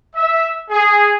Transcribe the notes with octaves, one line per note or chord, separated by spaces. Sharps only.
E5
G#4